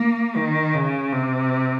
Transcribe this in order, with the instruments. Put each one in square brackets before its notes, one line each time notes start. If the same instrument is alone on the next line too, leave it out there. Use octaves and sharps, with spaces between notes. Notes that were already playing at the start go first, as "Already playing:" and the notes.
Already playing: [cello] A#3
D#3
C#3
C3